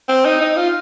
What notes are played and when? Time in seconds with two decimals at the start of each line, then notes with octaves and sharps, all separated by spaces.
0.09 C4
0.25 D#4
0.41 D#4
0.57 F4